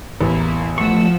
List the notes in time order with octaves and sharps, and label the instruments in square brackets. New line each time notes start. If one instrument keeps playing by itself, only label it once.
[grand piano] A1 [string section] E2 A#3 E4
[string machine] F3 [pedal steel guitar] A3 C#6 [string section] F#5 E6